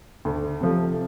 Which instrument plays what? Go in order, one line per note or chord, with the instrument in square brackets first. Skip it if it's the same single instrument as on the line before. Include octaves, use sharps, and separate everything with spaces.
[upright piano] D2
C3 F3 A3